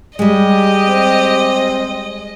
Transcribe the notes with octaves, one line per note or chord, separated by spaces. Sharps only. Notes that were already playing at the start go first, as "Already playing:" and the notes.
G3 G#3 G4 D#5
C4